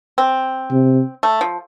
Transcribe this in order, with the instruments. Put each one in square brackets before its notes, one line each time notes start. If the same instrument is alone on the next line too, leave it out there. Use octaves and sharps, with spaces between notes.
[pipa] C4
[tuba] C3
[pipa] A3
F3